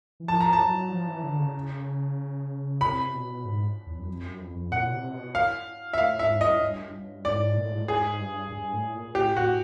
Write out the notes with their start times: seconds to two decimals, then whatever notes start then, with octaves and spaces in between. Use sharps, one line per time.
0.20 E3
0.28 F3 A5
0.41 A#5
0.53 A5
0.60 F#3
0.91 F3
1.07 E3
1.23 D3
1.39 C#3
2.81 C3 B5
3.14 B2
3.45 G#2
3.87 E2
3.99 F#2
4.08 F2
4.24 F#2
4.39 F2
4.56 F2
4.72 A#2 F#5
4.86 B2
4.93 C3
5.14 B2
5.35 F5
5.93 E5
5.98 A2 F5
6.19 G#2 E5
6.40 G2 D#5
6.62 G2
6.94 G2
7.25 G#2 D5
7.56 A#2
7.64 A2
7.72 G#2
7.79 A2
7.88 G#2 G#4
8.21 G2
8.52 G2
8.73 A2
8.95 A#2
9.07 A#2
9.15 A2 G4
9.36 A2 F#4